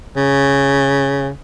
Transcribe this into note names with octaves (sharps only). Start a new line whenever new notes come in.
C#3